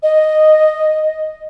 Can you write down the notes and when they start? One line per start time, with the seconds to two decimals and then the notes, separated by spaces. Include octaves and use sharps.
0.03 D#5